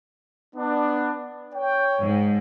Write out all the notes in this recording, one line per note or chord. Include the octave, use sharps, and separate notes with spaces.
B3 D4
C#5 G5
G#2